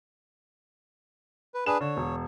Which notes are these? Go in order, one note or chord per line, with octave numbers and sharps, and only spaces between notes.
B4
D4 G#4 B4 E7
D3 C#5
E1